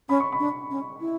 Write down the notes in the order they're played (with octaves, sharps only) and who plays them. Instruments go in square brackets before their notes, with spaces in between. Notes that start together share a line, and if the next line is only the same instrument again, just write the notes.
[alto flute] C#4 [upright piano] B5
[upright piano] C#6
B5
[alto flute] D4
C#4
E4